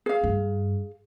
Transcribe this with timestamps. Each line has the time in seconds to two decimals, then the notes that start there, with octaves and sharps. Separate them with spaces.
0.06 G#4 F5
0.24 G2